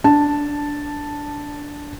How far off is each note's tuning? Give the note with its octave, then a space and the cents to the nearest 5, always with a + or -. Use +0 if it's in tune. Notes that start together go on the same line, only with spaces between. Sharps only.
D4 -10 A5 +0